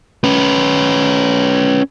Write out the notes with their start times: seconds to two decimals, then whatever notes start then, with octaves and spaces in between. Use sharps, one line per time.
0.24 C#4 B4